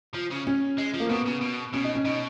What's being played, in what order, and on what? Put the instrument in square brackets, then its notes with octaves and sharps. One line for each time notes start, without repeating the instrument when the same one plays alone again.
[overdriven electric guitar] F3
C#3
[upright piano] C#4
[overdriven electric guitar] G#3
F3
[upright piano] A#3
[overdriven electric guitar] B2 [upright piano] B3
[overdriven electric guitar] C#3
B2
[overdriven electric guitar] B2 [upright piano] C#4
[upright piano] D#4
C#4
[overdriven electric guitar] B2 [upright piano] D#4